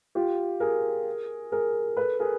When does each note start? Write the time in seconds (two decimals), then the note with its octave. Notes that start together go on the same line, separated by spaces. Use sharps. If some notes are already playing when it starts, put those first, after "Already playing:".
0.15 F4 G4
0.60 G#4 A#4
1.52 G#4 A#4
1.97 A4 B4
2.19 G#4 A#4